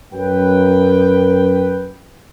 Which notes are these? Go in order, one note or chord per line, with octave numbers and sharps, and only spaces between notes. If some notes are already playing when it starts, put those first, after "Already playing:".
F#2 B4 G5